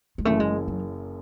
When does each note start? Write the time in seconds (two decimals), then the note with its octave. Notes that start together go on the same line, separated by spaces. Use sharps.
0.18 G#3
0.25 F#1 F#2 E3 A3
0.40 G#3
0.68 F#3